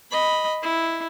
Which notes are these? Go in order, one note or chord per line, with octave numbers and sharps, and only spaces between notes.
D#5 B5
E4